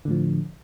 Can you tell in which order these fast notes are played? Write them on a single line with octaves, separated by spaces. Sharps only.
D3 A2 F3